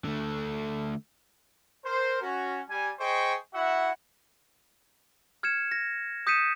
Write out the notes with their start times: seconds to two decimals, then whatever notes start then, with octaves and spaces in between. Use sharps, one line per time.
0.04 D3 A3
1.85 A#4 C5
2.22 C#4 F#4
2.70 G3 G#5
2.99 G#4 C5 D#5 G5 C#6
3.54 E4 F#4 E5 F#5
5.43 F6 G#6 C#7 E7
5.72 A#6
6.27 D#6 G6 B6 C#7 D#7 E7